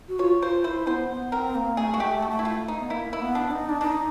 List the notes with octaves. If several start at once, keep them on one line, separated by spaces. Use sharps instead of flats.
F#4
F4 C#5
F4 C5
E4 C5
B3 C5
B3
C4 A#4
A#3
A3 G#4
F#4
G#3
A3 G4
F#4
A3
E4
F4
D#4
B3
A#3 E4
E4
B3
D4
D#4
D4
D4 D#4